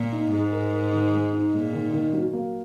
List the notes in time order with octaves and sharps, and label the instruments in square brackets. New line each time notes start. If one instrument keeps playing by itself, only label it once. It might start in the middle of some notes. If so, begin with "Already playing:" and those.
Already playing: [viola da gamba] A#2
[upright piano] D#4
[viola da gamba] G#2 [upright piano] G#3
[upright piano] A#4
A#4
D#3
G#3
D#4
[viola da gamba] A#2 [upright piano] G#3
[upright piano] D#3
D#3
F#3
A#3